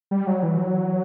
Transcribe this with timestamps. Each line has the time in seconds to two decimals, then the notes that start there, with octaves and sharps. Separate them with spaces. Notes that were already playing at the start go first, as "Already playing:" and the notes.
0.11 G3
0.27 F#3
0.43 E3
0.58 F#3